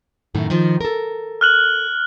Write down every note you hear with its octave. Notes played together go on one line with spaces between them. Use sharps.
F#2 A2 D#3
D#3 F3
A4 A#4
F6 F#6 F#7